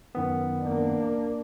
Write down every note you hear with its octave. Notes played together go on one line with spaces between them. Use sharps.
F#2 D#3 B3
A#3 D4